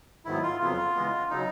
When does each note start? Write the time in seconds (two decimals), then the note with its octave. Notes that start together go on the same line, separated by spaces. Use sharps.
0.25 G#2 D#3 F#3 B3 E4
0.43 F4
0.60 F2 C#3 F#3 B3 F4
0.95 C#3 E3 G#3 B3
1.30 C#3 F#3 D#4